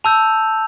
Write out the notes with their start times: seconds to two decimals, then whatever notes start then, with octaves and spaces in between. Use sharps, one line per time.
0.04 A5 E6 G6 F7